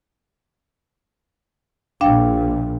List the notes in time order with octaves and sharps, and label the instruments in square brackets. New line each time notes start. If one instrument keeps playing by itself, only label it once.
[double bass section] A#1 A#2 [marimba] D4 F5 G5